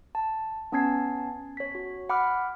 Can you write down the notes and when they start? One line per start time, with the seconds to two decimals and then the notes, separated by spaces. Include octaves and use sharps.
0.15 A5
0.72 B3 C#4 A5 G#6 C7
1.57 C#5 B6
1.75 F#4
2.09 F#5 B5 D6 F6